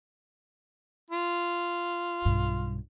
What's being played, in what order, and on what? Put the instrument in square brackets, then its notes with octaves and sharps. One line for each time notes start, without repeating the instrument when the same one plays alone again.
[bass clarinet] F4
[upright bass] B1 G2